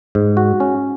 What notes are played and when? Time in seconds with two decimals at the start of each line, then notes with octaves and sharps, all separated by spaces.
0.15 G#2
0.37 F#4
0.60 C#4